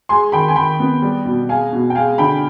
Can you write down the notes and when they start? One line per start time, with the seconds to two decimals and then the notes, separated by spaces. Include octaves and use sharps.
0.09 G#3 G#5 C6
0.32 D#3 G5 B5
0.48 G#5
0.56 D#3 G5 B5
0.80 B3
1.02 G3
1.25 B2
1.49 G#3 F5 G#5
1.73 B2
1.90 G5
1.95 G#3 F5 G#5
2.18 D3 G5 B5